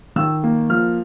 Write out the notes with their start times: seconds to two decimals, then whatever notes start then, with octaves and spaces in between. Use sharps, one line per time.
0.16 D#3 E6
0.44 A#3
0.69 F3 F6